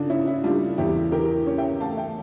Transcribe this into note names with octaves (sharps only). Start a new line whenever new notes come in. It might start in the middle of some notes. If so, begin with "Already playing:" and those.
Already playing: C#3 D4 F4 A4
C#4 E4
E4
G3 D4 F4
E2 E4 G4
E3 G4 A#4
C#4
E5 G5
A3 F5 A5
E5 G5